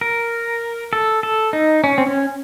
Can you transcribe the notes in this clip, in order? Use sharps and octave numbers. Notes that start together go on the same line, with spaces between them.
A#4
A4
A4
D#4
C#4
C4
C#4